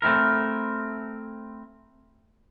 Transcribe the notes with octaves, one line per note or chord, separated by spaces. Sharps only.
A3 C4 E4 A#4